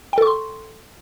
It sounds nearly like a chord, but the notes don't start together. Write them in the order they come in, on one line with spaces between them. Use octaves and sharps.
G5 A4 C#6 C6